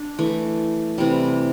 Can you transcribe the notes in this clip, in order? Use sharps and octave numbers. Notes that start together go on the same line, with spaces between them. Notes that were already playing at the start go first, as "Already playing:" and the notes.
Already playing: D4
E3 A3
C3 E3 G3